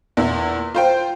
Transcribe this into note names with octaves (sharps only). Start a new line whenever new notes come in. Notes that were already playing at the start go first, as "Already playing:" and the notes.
E2 A#2 E4
F4 C5 G5